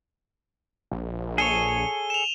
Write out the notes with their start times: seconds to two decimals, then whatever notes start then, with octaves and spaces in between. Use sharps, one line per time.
0.92 A#1
1.38 G#4 A4 C#5 D#7 G7
2.10 E7 F7